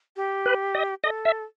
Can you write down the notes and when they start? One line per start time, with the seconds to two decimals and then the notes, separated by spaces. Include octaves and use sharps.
0.16 G4
0.46 B4
0.75 D#5
1.04 A4 D#5
1.25 E5